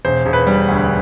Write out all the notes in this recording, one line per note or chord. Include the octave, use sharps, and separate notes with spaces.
E1 C5
E1
B4
G3
D2